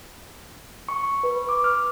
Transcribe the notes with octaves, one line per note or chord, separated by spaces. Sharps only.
C#6
B4
D6
F6